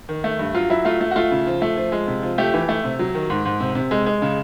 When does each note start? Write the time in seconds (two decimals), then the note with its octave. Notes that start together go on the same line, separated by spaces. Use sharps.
0.09 D#3
0.24 A3
0.39 G2
0.54 F#3 F4
0.70 F#3 E4
0.85 A3 F4
1.01 A3
1.11 F#4
1.16 A3 F4
1.31 C#3
1.47 F3
1.62 A3
1.77 F3
1.92 G#3
2.08 C3
2.23 F3
2.38 A3 G4
2.54 E3
2.69 A3
2.84 C3
2.99 F#3
3.15 D#3
3.30 G#2
3.45 G#2
3.60 C3
3.75 C3
3.91 G#3
4.06 G#3
4.22 C#3